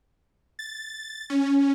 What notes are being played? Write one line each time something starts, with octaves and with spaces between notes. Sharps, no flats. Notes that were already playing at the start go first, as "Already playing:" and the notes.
A6
C#4